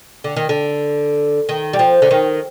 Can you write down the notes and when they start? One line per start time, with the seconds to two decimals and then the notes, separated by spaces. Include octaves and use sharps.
0.24 D3
0.36 D#3
0.49 D3
1.49 D#3
1.73 G3
1.79 F3
2.02 D3
2.11 D#3